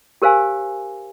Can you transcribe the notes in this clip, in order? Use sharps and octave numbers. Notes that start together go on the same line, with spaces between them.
G4 A#4 C5 F5 G#5